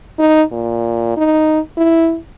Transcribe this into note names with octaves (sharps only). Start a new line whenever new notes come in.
D#4
A#2
D#4
E4